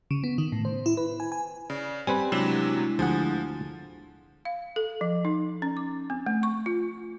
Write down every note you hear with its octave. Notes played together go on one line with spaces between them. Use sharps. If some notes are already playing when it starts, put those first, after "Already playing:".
C#3
B3
D#3
A2
C5
E4
B4
G#5
G#5
C#3 D5
G3 C4 G4 B4 G#5 B5
C3 F#3 G#3 D4 E4 E7
D2 F3 G#4 F#5
F5
A4
F3
D#4
C#4
D6
C4
A3
C#6
F4